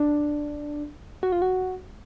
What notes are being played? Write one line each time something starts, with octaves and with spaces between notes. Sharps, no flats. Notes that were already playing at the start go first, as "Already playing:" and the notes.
Already playing: D4
F#4
F4
F#4